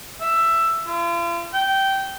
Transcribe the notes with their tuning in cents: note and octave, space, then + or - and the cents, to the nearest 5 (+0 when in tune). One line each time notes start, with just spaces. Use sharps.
E5 +10
F4 -40
G5 -15